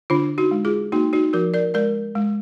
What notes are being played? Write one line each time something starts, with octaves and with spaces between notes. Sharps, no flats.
D3 D4 F4
D#4 F#4
G#3
F4 G#4
A#3 D#4 F#4
D#4 F#4
F3 F#4 A#4
A#4 D5
G#3 A#4 D5
G#3